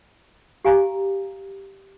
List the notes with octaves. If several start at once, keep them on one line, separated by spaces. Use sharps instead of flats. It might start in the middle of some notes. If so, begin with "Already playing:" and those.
G4 F5 G#5 A#5